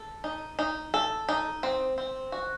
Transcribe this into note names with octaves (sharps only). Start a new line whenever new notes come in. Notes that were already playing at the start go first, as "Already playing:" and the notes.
Already playing: A4
D#4
D#4
A4
D#4
C4
C4
F#4